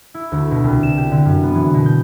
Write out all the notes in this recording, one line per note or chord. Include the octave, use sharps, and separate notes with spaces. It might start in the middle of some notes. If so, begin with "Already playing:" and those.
E4
D2
B2
C2
E7
G4
D3
F#2
B3
E3
B2
G6